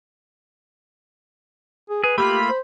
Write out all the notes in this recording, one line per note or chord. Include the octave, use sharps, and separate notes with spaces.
G#4
G#4 B4
A3 A#3 F4 G4 B5
C5